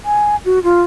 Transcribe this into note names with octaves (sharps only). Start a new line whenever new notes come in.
G#5
F#4
F4